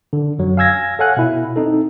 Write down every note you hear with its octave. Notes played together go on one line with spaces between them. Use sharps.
D3
F#2 F#3
F5 G#5 E6 G#6 A#6
A4 C#5 F5 F#5 G#5 F#6
B2 E4
C4 D#4 A4